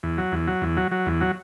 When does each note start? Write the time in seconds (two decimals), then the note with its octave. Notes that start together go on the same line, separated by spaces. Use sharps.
0.03 E2
0.18 F#3
0.32 E2
0.47 F#3
0.62 E2
0.77 F#3
0.92 F#3
1.06 E2
1.21 F#3